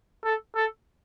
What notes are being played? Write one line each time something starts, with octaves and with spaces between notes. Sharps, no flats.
A4
A4